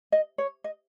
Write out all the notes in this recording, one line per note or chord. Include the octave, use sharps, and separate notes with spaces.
D#5
C#5
D#5